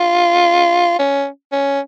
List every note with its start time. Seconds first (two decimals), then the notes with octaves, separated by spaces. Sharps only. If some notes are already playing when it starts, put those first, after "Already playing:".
Already playing: F4
0.99 C#4
1.52 C#4